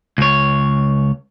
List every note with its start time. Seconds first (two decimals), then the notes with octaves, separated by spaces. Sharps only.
0.18 C#2 C#5